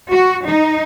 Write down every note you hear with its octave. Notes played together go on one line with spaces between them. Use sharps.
F#4
D#4